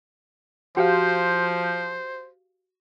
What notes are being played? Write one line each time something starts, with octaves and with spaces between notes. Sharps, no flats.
F3 F#4 G4 C5 F5